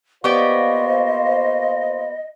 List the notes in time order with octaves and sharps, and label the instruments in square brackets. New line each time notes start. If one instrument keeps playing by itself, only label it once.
[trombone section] A#3 F4 C5 [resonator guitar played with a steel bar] B3 G4 D5 [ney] D#5 [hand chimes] C#6